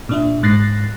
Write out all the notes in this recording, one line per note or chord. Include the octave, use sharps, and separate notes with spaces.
A#2 D4 E5
G#2 F#6 A6 A#6 C7